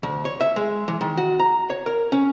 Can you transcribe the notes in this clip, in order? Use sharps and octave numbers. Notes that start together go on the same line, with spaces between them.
D2
C#5
E5
G#3
E3
D#3
F#4
A#5
C#5
A#4
C#4